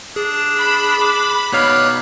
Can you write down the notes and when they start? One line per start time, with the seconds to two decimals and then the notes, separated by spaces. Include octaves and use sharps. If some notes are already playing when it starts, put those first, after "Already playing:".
0.16 D4 G#4
0.58 B5
1.01 D6
1.53 B2 D#4 C#5 D5 F5 F#6